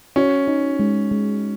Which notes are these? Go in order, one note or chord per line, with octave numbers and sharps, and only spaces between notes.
C#4 F#4
D#4
G#3
G#3